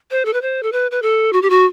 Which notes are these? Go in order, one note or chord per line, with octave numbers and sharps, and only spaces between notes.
C5
A4
B4
C5
A4
B4
B4
A4
F#4
G4
F#4